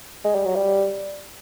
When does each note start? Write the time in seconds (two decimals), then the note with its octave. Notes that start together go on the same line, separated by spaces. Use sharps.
0.24 G#3
0.35 G3
0.45 F#3
0.55 G3